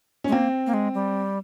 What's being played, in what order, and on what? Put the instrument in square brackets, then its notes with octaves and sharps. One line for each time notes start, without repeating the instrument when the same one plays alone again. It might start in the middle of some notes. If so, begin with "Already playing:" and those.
[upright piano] C#4
[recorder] G#3
[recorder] A#3 [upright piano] C4
[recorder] A#3
G#3
G3